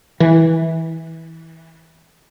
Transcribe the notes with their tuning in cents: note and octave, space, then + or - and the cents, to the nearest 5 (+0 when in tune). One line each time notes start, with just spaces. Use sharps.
E3 -20